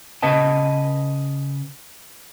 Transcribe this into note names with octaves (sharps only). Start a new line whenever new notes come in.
C#3 B4 D#5 A5